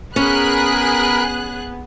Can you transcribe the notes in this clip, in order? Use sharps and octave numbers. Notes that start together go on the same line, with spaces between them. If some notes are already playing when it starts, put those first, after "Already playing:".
B3 C#4 G#4 A#4 B5 F#6